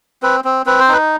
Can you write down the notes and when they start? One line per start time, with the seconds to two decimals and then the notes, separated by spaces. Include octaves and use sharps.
0.22 C4 B4
0.44 C4
0.66 C4 B4
0.80 C5
0.88 D#4 B4